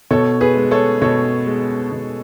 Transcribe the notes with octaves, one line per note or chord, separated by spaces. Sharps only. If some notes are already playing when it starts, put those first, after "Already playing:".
B2 A4 C#5
G#4 B4
G#3
A4 C#5
B2 A4 C#5
G#3
B2